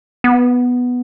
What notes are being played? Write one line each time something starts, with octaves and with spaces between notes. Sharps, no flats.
B3